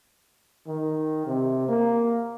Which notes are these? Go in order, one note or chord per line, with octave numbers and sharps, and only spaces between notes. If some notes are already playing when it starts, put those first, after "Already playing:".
D#3
C3
A#3